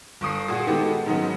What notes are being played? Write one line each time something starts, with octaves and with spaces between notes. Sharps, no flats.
G1 C#6 D#6 C7
A#2 F#4 G#4
D#3 G#3 B3 F#4 G4 A4
G#2 D#3 F#3 G#3 B3 C#4